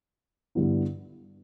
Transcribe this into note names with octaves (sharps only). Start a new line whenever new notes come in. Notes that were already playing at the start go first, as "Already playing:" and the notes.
G2 D3 G3 B3 E4